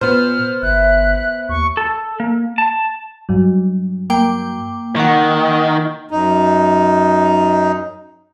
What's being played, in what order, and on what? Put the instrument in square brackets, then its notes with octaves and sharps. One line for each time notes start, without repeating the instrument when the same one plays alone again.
[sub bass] A#2 [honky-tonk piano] B3 C5 [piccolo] F6
[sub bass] G1 [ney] E5 [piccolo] F#6
[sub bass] D#2 [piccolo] C#6
[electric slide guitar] A4
A#3
A5
[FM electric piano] G2 F#3
[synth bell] A#3 G5 D6
[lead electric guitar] D#3 [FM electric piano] F#5 C#6
[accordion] F#2 D#4